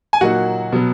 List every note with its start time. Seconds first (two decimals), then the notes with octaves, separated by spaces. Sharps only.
0.13 G#5
0.21 A#2 F#3 A#3 D#4 F#4 F#5
0.72 B2 F#3 B3